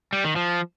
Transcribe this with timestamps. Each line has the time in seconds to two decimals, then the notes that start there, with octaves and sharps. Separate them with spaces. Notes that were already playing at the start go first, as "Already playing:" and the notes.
0.13 G3
0.24 D#3
0.36 F3